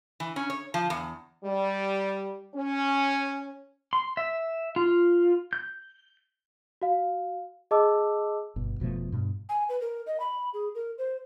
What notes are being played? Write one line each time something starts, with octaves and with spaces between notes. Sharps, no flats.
E3
C#4
C#5
F3
E2
G3
C#4
C6
E5
F4
G6
F#4 F5
G#4 D#5 A5 D6 E6
G1 B2
F1 B2 F3 A3
G2 B2
G#5
B4
A#4
D#5
B5
G#4
A#4
C5